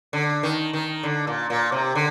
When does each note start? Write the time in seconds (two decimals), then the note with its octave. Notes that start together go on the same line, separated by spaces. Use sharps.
0.13 D3
0.43 D#3
0.73 D#3
1.03 D3
1.27 A#2
1.50 A#2
1.72 C3
1.95 D3